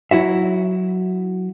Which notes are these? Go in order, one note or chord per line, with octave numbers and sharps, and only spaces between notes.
F#3 E4 F#4 E5